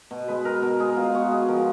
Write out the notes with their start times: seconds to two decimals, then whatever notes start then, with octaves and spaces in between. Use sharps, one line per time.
0.11 B2
0.28 G#3 B4
0.45 B2 A#4
0.62 B2 A#4
0.80 G#3 G#4
0.96 B2 F4
1.14 B3 F#4
1.31 G#3 G#4
1.48 F3 A#4